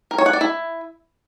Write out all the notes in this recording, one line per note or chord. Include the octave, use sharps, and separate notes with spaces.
A#4
C#5
F#5
D5
E4